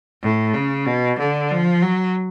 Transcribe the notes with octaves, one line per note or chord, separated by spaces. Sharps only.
A2
C#3
B2
D3
F3
F#3